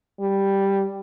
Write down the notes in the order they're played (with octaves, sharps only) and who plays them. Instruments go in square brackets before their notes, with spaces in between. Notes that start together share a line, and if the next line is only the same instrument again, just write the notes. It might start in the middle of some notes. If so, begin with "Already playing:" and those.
[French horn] G3